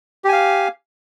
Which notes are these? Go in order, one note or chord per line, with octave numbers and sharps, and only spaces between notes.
G4 F5 G#5